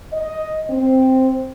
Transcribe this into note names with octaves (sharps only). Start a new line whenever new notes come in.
D#5
C4